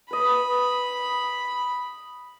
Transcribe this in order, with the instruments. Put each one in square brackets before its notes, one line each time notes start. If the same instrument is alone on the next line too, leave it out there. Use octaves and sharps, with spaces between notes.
[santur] B4 D#5 [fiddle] B5